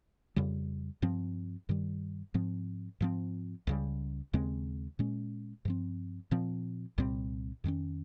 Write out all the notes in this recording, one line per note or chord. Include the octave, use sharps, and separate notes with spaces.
F2 C#3 G3
G2 F3 C4
G2 D#3 G3
G#2 F3 C4
G#2 F3 C4
C#2 C#3 G3
D#2 C#3 G#3 C4
A#2 G#3 C#4
G2 F3 C4
A#2 F3 C4
C2 A#2 G3 C4
F2 D#3 G#3 C#4